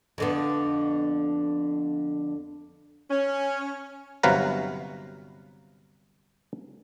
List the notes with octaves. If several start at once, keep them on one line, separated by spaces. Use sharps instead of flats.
F2 D3 B3
C#4
G1 C3 F#3 B4 F5 A#5